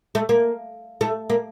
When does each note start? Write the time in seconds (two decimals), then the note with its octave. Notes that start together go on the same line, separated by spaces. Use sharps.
0.15 A3
0.29 A#3
1.01 A3
1.30 A#3